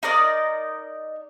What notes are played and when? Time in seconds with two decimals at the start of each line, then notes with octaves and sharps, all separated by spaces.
0.03 D#4 A#4 D5 D#5